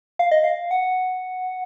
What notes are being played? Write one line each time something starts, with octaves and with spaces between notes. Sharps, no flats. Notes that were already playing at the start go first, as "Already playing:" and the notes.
F5
D#5
F5
F#5